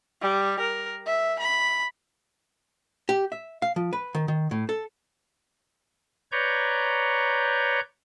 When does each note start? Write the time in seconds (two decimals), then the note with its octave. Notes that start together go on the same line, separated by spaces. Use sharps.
0.21 G3
0.59 A#4
1.06 E5
1.39 B5
3.09 G4
3.32 E5
3.62 F5
3.76 F3
3.93 B4
4.15 D#3
4.28 D#3
4.51 A2
4.69 A4
6.32 B4 C#5 D5 A#5 C#6 G6